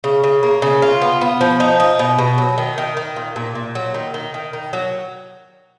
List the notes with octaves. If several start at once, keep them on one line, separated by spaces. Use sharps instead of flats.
C#3
C#3
A#3
C#3
F4
B3
B3
F3
D#4
D#4
B2
B2
F#3
D#3
D#3
D#3
A#2
A#2
A#2
F#3
D#3
D#3
D#3
D#3
F#3